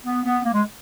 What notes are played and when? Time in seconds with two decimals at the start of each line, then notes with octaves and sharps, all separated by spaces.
0.06 B3
0.25 B3
0.44 A#3
0.53 G#3